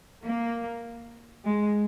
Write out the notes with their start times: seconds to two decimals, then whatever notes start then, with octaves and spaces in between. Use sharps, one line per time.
0.24 A#3
1.44 G#3